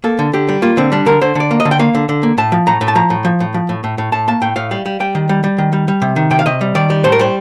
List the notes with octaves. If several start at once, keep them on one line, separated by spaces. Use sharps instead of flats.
A#3 A4
D3
D3 G4
G3
A#3 F4
D3 C4
G3 D4
D3 A#4
D3 C5
D3 D5
A#3
D#5
D3
G5
A#3 F5
D3
D3
A#3
A2 A5
F3
A2 A#5
A2
A5
F3 A#5
A2
F3
A2
F3
A2
A2
A2
A2 A5
A#3 A5
A2 G5
A2 F5
G3 F5
G3
G3 G5
D#3
G3
G3
D#3
G3
G3
C3
D#3
C3 G5
F5
C3 D#5
G3
D#3 D5
G3
A2 C5
A#4
G3 C5